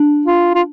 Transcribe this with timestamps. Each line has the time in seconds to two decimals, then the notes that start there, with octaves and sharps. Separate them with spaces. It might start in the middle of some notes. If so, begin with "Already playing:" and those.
Already playing: D4
0.26 F4
0.55 F4